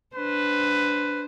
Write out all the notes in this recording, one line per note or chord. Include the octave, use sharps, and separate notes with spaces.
D4 B4 C5